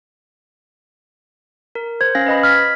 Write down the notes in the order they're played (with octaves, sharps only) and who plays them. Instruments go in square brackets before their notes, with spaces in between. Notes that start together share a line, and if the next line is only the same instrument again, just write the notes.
[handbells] A#4
[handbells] C5 [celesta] G#6
[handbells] C#4 F5 A#6
B4 D#5 B5
[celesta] F6 [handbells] G#6 B6